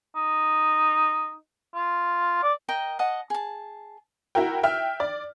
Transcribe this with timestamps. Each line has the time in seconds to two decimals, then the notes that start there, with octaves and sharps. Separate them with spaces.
0.15 D#4
1.75 F4
2.43 D5
2.69 A#4 D#5 G5
2.99 D#5 F#5 A5
3.30 G#4 A5
4.35 E4 F#4 A#4 G5
4.63 E5 G5 F6
5.00 D5